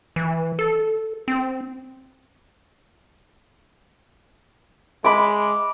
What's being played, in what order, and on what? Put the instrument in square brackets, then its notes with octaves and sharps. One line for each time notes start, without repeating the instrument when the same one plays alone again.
[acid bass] E3
A4
C4
[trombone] G#3 [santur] B5 D6